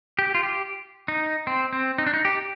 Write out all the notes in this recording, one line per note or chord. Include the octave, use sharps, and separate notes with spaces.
G4
F4
G4
D#4
C4
C4
D#4
D4
D#4
G4